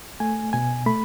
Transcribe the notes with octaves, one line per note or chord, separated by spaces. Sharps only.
A3 G#5
B2 G#5
A3 B5